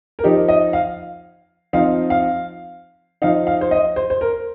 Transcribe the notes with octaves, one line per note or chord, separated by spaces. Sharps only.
A#4
F3 D#4 G4
D#5
F5
F3 C4 D#4 F5
F5
F3 D#4 F5
F5
C5
D#5
C5
C5
A#4